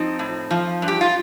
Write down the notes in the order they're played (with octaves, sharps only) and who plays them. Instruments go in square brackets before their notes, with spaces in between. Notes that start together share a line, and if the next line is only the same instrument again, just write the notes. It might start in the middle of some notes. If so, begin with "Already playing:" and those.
Already playing: [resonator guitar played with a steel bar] F3 C4 D#4
A2
F3
G2
G4
F4